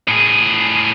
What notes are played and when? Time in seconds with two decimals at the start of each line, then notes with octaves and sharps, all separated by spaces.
0.08 A2 G#4